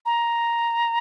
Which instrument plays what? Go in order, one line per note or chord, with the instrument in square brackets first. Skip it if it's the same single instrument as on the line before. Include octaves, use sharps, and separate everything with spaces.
[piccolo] A#5